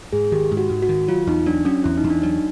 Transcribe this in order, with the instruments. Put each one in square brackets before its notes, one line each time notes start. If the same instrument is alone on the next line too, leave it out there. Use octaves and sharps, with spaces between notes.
[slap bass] G#2 [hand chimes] G#4
[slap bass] D#3 [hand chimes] G4
[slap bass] G#2
[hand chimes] F#4
[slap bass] G#2
[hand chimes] F#4
[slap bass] D#3
[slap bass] F#3 [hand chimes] F4
[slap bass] E2 [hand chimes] D#4
[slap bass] F#3 [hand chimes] D4
[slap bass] F#3 [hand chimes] C#4
[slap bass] E2 [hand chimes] E4
[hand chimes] D#4
[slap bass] E2
[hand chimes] D4
[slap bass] F#3 [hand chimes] D#4